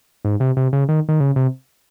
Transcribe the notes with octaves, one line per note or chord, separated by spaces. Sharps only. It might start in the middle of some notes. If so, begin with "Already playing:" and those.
G#2
C3
C3
C#3
D#3
D#3
C#3
C3